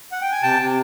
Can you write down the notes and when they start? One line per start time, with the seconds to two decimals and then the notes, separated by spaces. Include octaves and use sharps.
0.12 F#5
0.22 G5
0.32 G#5
0.43 C3 G5 A5
0.60 C3